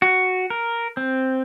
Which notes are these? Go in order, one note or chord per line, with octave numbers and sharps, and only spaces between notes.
F#4
A#4
C4